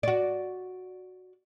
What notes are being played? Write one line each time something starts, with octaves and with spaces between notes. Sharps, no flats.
F#4 D5